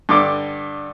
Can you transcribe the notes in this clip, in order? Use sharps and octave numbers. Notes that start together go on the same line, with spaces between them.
G2 D3 D6